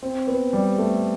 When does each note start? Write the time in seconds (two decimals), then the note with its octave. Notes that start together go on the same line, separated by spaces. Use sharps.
0.03 C4
0.27 B3
0.53 G3
0.78 A3